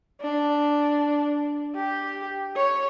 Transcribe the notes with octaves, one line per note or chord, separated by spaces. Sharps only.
D4
G4
C#5